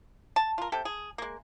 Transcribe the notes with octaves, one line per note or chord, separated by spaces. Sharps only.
A5
F4 A#4
C3 A4 G5
G#4
G#3 A#3